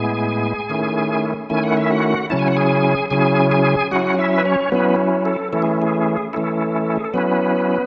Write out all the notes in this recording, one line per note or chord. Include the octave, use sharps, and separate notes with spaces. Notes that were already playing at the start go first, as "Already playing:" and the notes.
Already playing: A2 G#3 B3 E4 G#4 G#5
D#3 A3 C#4 E4
D#3 A3 C#4 E4 G#5
F#5
E5
F#4 F#5
C#3 F#3 C#4 E4 A5
G#5
F#5
G#4 G#5
C#3 F#3 C#4 E4 G#4 G#5
G#4 G#5
F#3 C#4 E4 F#4 F#5
E4 E5
B4
C#4 C#5
F#3 B3 C#4 E4 B4
A4
E3 A3 C#4 E4 A4
G#4
G#4
E3 A3 C#4 E4 A4
G#4
A4
F#3 B3 C#4 E4 B4